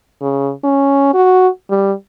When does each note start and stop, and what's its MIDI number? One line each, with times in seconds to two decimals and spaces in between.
0.22 0.51 49
0.64 1.12 61
1.14 1.48 66
1.70 1.93 55